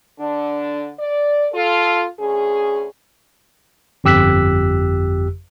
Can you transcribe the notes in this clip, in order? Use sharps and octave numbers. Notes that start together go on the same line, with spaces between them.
D3 D4
D5
F4 A4
D2 C#4 G#4
G1 F2 G4 E6 F#6 B6